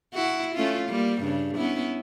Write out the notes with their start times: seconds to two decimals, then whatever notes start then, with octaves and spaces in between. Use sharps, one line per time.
0.14 E4 F#4
0.55 A3 C#4 F4
0.89 G3 A#3
1.21 G2 C#3
1.55 B3 C#4 E4